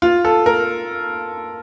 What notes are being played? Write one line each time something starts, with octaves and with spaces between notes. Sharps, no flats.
F4
A4
A#4